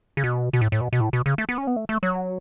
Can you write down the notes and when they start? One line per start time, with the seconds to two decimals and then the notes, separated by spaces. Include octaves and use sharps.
0.17 C#3
0.24 B2
0.53 B2
0.61 A2
0.72 A2
0.81 B2
0.93 B2
1.00 A2
1.13 B2
1.26 C#3
1.38 A3
1.49 B3
1.58 C#4
1.67 B3
1.76 A3
1.89 A3
2.03 F#3